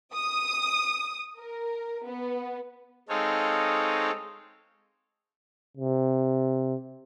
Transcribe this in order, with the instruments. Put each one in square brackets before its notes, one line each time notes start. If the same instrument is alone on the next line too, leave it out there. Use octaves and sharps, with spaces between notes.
[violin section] D#6
A#4
B3
[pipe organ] G#3 C4 D#4 A4 C#5 F5
[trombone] C3